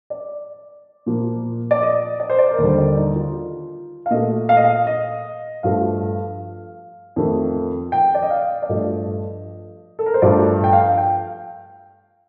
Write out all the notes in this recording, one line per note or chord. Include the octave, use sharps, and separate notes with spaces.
D5
A#2 F3 A#3
D5
D#5
D5
C5
D5
A#4
D#2 D3 G3 C5
D5
D#4
F4
F5
A#2 A3 D#5
F5
D#5
F5
D#5
G2 F3 A3 F5
F2 D#3 A3
G5
D5
D#5
F5
D5
G2 F3 A3 D#5
A4
A#4
C5
G2 F3 A3 D5
G5
F5
F5
G5